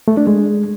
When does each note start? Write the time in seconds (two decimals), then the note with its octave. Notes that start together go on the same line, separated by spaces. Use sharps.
0.08 A3
0.17 D4
0.27 G#3